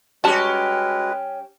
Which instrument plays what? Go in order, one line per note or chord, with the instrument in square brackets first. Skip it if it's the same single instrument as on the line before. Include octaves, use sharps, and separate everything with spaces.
[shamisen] G3 A5 [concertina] G#3 B4 [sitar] C#4 G4 [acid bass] F#4